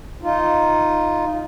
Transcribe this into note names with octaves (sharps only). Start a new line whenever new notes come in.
D#4 F4